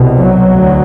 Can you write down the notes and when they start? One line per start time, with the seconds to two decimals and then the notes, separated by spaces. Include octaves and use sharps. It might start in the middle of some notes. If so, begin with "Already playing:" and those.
Already playing: C2 B2
0.17 F#3
0.53 D2